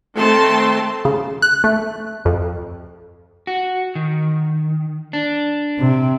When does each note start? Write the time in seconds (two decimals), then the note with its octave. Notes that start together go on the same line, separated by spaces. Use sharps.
0.16 D#3 A3 C4 A5 C6
1.05 C#3
1.42 F#6
1.64 A3
2.25 F2
3.47 F#4
3.95 D#3
5.13 D4
5.79 C3